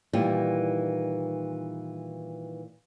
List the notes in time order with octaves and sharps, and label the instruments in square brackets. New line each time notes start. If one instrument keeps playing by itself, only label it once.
[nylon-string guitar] A#2 D#3 E3 G3